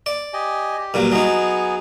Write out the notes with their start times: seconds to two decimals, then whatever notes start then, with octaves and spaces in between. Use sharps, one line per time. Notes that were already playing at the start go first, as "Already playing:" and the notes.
0.06 D5
0.33 G4 D#5 G#5
0.77 G4
0.94 G2 A#2 F#3
1.12 F#3 B3 D#4 G#4 G#5